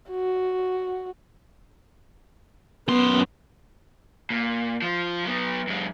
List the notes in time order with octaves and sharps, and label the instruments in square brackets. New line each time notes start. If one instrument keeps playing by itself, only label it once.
[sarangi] F#4
[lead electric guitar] F#2 C6 [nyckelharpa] B3
[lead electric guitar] A#2
F3 F4
F#3 B3
F#2 G#3